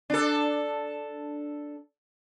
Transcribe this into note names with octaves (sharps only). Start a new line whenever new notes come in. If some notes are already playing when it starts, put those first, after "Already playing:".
D4 A4